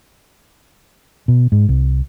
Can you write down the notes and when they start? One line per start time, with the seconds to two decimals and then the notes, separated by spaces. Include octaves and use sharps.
1.28 B2
1.52 G#2
1.69 C2